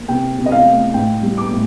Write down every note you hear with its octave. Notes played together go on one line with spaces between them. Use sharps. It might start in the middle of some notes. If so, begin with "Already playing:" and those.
Already playing: A#3
C3 G5
C3
D#5
F5
A3
A2 G5
G3
D6
A2